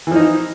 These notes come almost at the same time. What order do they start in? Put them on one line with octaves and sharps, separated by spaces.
E3 F3 D#4